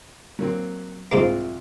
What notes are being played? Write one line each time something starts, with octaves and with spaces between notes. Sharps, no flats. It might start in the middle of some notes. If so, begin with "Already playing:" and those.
F#3 A#3 C4
C2 G#2 C3 G#3 A#3 F4